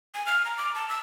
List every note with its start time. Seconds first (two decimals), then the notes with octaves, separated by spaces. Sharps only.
0.14 G#5
0.26 F6
0.45 A#5
0.58 D6
0.75 A5
0.89 E6